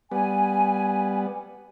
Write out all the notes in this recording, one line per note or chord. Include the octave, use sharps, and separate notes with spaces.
G3 B3 G#5